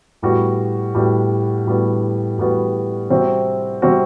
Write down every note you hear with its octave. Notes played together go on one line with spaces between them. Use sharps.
A2 G3 B3 F#4
A2 G3 B3 F#4
A2 G3 B3 F#4
A2 G3 B3 F#4
C3 G3 C4 F#4
C3 G3 C4 F#4